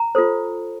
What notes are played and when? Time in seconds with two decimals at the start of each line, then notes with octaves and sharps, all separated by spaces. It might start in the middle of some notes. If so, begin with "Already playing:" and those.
Already playing: A#5
0.15 F4 A4 C5